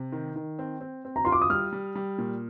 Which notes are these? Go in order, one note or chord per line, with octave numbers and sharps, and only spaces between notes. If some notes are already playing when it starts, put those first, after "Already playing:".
Already playing: C3
D#3
D#3
C4
C4
C4
A#5
F4 C6
D6
D#6
G3 F6
G3
G3
A#2